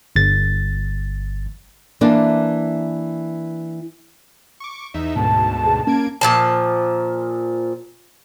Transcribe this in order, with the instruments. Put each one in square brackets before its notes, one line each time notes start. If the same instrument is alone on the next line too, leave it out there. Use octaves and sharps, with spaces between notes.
[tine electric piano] G1 A6
[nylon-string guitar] E3 A#3 D4
[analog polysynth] C#6 D6
E2 D#4 E5
[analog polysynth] D2 G#2 B2 [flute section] A5
[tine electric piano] G#4
[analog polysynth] A#3 G#6 D7 [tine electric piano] C#4
[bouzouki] A#2 F3 A5